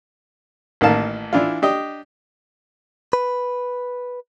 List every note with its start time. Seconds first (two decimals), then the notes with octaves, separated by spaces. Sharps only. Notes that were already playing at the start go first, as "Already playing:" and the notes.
0.81 A1 D#3 A#3 F5 A5
1.33 E3 D4 E4 F4
1.62 D4 G4 D#5
3.13 B4